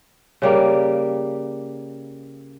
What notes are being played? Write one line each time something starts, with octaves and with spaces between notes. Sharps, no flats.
C#3 G3 A#3